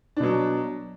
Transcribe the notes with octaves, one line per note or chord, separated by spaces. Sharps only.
B2 F#3 D4